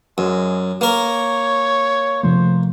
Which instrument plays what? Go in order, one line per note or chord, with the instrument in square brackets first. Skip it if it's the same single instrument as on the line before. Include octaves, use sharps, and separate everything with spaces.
[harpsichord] F#2 [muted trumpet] G#3
[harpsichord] A#3 A#4 [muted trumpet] C#5
[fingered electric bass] C3 F3 A3 [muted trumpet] C5